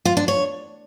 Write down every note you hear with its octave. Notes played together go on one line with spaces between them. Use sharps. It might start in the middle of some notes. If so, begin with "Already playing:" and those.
F4
D4
C#5